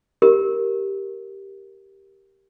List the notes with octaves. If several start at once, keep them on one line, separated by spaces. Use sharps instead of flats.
G4 A#4